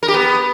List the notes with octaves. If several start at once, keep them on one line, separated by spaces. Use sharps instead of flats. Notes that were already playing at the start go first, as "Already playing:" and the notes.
A#4
G4
B3